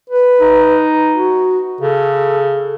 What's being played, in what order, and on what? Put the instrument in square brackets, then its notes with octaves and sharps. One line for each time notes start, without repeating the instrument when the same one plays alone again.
[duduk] B4
[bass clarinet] D#4
[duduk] F#4
[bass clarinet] C#3 [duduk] A4